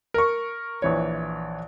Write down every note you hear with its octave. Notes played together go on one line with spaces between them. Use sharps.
A#4 C#6
A#1 E3 C#5